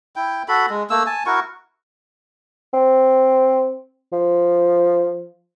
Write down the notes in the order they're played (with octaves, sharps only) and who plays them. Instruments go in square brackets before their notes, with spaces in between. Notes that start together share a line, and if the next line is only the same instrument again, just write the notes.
[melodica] E4 G5
F#4 A4 B5
G#3
A3 A#3 E6
G#5 A5
E4 F#4 A#4 C#6
[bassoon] C4
F3